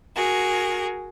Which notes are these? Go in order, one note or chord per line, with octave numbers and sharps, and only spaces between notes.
F#4 G#4 A#4